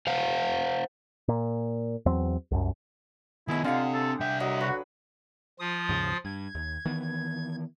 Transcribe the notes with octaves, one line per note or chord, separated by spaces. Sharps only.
C5 F5 F#5
A#2
E2 F#3 C4
C2 F#2
D#3 B3 E4 G#4 D#5
D3 C4 F4 G4 F5 F#5
A4
C2 E5 G5
F#3 D#5
F#4 B4
F3 F4 D#6
D#2 G#2 C#3
G2 G#6
D#2
D#3 E3 B3